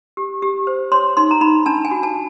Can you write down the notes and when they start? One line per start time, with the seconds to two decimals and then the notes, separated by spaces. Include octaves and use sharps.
0.17 G4
0.42 G4
0.67 C5
0.92 C#5 C6
1.17 D#4 C6
1.31 A#5
1.41 D#4 B5
1.66 D4 A5
1.85 G#5
1.91 F#4
2.03 A5